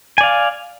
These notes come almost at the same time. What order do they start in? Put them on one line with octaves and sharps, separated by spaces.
G#5 D5 F5